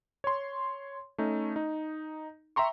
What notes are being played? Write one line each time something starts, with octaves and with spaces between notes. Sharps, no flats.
C#5 C6
A3 C#4 D#4
D#4
E5 G5 A#5 C6 C#6